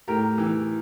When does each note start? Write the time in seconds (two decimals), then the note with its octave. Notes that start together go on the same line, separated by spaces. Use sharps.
0.08 A2 G4 A#4
0.38 E3